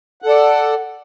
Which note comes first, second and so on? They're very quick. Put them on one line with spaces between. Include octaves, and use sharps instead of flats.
F#5 A4 D5